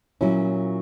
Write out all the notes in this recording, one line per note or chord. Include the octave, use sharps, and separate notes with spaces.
A#2 F#3 A#3 C#4 E4